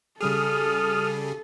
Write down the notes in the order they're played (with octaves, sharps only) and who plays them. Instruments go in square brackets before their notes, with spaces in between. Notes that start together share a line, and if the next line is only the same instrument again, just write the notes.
[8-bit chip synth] C#3 G3 G#4 [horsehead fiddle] A4 [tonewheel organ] D#6 F6